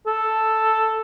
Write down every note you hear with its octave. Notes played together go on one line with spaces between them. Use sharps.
A4